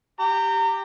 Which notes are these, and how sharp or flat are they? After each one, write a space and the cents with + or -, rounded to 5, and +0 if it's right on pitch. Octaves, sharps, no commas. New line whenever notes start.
G4 +0 A#5 -25